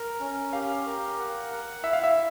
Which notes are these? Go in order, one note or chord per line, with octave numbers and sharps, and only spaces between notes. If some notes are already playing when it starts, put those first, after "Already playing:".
Already playing: A#4
C#4
G4 F5
A#4
F#5
F#5
E4 E5
F5
E5